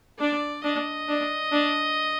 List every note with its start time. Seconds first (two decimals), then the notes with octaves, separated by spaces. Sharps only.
0.20 D4 D5
0.64 D4 D#5
1.09 D4
1.52 D4